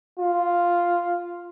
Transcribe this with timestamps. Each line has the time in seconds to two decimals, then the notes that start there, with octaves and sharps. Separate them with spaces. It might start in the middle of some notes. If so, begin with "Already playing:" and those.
0.20 F4